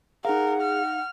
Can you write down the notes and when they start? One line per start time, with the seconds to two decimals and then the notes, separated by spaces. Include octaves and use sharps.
0.25 D#4 G#4 A#4 F5 F#5
0.61 F6